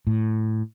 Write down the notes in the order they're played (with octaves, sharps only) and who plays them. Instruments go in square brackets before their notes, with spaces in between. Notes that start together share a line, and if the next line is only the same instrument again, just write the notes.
[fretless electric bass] A2